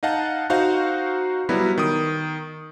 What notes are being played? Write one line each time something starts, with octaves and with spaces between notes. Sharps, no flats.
D#4 D#5 F5 F#5 A5
D#4 F#4 C5 F5 F#5
F#3 G3 B3 E4
D#3 D#6